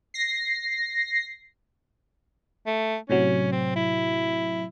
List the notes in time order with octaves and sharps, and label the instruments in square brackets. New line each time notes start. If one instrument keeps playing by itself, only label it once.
[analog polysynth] A#6 C7
[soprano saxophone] A3
[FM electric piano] A2 C3 F#3 [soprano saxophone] C#4
[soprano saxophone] C4
E4